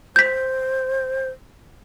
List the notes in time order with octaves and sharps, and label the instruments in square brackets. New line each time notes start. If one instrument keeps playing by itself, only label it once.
[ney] C5 [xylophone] G6 B6